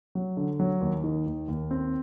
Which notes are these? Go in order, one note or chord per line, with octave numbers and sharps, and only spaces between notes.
F#3
D3
F#3
D#2
D#3
D#2
D#2
C4